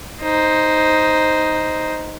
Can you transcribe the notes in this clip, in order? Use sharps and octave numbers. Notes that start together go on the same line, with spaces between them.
D#4 C5